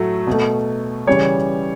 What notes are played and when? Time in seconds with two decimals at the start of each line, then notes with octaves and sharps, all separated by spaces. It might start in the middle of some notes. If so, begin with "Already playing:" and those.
Already playing: A2 F#3 A3
0.27 B2 A3
1.07 C#3 E3 G3 C#5